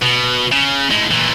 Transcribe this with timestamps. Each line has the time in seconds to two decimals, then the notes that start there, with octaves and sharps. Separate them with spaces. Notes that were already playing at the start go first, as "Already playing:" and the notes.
0.02 B2
0.52 C#3
0.91 A2 G#3
1.11 A#2 E3